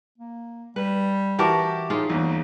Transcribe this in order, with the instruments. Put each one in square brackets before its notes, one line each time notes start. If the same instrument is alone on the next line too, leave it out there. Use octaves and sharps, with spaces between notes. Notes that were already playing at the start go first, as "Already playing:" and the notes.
[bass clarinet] A#3
[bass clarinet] G3 [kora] B4
[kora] E3 F#4 A#4 [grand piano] G4 A5 D6
[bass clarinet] A2 [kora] G#3 D#4 F4
[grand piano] G1 E2 [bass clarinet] A#3